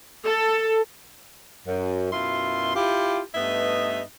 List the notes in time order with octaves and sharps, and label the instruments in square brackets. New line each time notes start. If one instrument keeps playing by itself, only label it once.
[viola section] A4
[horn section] F#2
F#2 B2 E4 F4 C6
E4 F4 G4
G2 A3 B3 D#4 D#5 E5